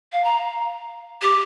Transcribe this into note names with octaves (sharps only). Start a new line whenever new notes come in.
F5
A#5
G4